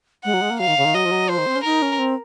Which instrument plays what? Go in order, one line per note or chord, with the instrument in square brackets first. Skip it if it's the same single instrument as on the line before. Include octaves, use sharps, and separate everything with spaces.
[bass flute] G#3 [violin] F#5
[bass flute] F#3
G#3
A#3
[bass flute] F#3 [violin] F5
[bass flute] D#3
C#3
D#3
[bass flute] F#3 [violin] D#5
[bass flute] F3
F#3
[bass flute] F3 [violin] C5
[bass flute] D#3
C4
C#4
[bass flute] D#4 [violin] A#4
[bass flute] C#4
C4